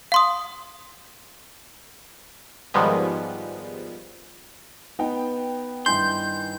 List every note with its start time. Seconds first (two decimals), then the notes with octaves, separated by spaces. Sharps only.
0.12 F5 C6 D#6
2.74 G#2 D#3 F3 G3 G#3 B3
4.99 B3 D#4 B4 G5
5.86 G2 D#3 E4 G#5 C6 G6